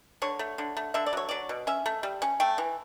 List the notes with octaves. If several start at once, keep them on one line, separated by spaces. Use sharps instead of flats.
D3 C#5
A3
D3
A3
D3 E5
D5
F#3 C#5
F#3 D5
B2
C#4 E5
A3
G3
C#4
A3 G5
E3